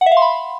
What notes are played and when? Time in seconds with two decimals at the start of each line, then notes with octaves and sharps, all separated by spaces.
0.01 F#5
0.06 E5
0.12 F5
0.17 C6
0.22 B5